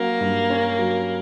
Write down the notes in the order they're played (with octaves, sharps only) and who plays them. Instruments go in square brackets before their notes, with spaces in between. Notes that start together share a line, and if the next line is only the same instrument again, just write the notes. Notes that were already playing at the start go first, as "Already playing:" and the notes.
Already playing: [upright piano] F#3 C#4 F#4 [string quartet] A#3
[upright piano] G2
C#4
F#3